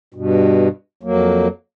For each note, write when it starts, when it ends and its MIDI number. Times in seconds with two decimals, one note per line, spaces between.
0.14 0.68 43
0.14 0.68 47
1.03 1.48 41
1.03 1.48 54
1.03 1.48 58